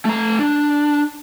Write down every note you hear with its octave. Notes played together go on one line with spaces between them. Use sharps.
A3 A#5
D4